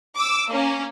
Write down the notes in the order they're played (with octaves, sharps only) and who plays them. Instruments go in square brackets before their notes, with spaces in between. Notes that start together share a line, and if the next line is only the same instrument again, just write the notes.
[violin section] D6 E6
A#3 C#4